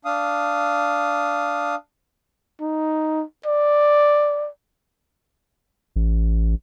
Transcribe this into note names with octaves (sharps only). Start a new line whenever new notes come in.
D4 F5 D#6
D#4
D5
A1